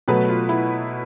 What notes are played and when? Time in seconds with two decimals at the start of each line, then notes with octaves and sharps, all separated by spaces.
0.08 B2 F#3 A3 B4
0.29 F4
0.49 E4